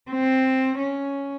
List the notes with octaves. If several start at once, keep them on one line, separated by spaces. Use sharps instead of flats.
C4
C#4